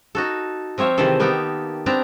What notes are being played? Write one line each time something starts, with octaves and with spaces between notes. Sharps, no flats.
D#4 F#4 A4
F3 C4 C#5 E5 F5
C3 D#3 E3 G#4 A4 C5
A#3 B3 D#4 G4 A4
B3 C4 D4 A5 A#5